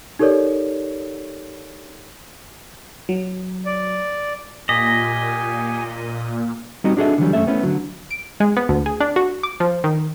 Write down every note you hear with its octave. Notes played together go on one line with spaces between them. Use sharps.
D#4 G4 A4 A#4 C#5 D5
F#3
D5
A#2 G4 D#5 G#5 B6
G3 B3 C4 D#4 F#4 D#5
D4 F#4 G#4 A4 D#5 E5
D3 E3 F#3 G3
F#2 A3 C#4 A4 E5
A3 B3 C#4 E4
D3 F#3
D7
G#3
B3
D2
G#4
D4
F#4
D6
F3
D#3